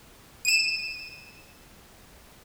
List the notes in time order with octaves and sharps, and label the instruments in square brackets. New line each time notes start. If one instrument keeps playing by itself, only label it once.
[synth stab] D#7 E7